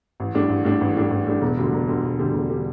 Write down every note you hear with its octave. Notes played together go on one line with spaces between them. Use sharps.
A1
A2 G3 D4
A1
A2 G3 D4
A1
A2 G3 D4
A1
A2 G3 D4
E1
D2 D3 G3
E1
D2 D3 G3
E1
D2 D3 G3
E1
D3 G3